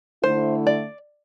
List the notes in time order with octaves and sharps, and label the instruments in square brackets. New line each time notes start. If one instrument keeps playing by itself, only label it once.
[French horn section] D3 A3 E4 [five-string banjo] C5
[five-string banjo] D5